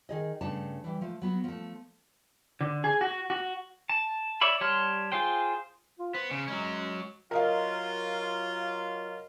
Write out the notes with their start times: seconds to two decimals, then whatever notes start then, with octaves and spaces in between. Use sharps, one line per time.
0.09 D#3 G#4 D#5
0.41 G2 C#3 A3 D4 A5
0.84 E3 G3
1.01 F3 A3
1.22 F#3 B3 F#4
1.44 F3 A3
2.61 D3
2.84 G#4
3.01 F#4
3.30 F#4
3.89 A5
4.41 C#5 D5 E5 B5
4.61 G3 C#5 A5 C6 F6
5.12 F4 G#4 C5 G5
5.99 F4
6.15 B3 C5
6.31 C#3
6.48 F#3 G#3 C#4
7.31 F#3 F4 A#4 D#5 F5